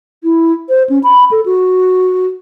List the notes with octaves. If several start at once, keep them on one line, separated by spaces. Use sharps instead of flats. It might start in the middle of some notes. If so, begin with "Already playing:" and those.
E4
C5
C#4
B5
A4
F#4